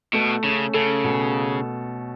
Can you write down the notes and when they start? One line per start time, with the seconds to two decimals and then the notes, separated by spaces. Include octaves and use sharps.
0.13 B2 A3
0.43 C#3 C#4
0.74 C#3 A4
1.04 B2